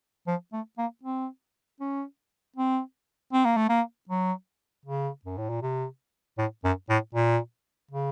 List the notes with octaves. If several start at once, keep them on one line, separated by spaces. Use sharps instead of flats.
F3
A3
A#3
C4
C#4
C4
C4
A#3
A3
A#3
F#3
C#3
F#2
A2
A#2
C3
A2
F#2
A2
A#2
C#3